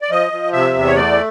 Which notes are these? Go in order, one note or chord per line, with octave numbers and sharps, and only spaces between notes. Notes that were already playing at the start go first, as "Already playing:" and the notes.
D5
F3 D#5
F3
C3 E5
E2
C#5
A3 D5